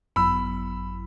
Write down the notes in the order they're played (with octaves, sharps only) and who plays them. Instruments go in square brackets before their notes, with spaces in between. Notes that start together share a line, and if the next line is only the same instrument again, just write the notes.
[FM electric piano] G#1 F#2 F#3 B3 E4 [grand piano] B5 E6